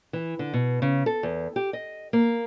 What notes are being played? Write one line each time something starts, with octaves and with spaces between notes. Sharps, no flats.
E3
D3
B2
C#3
A4
E2
G4
D#5
A#3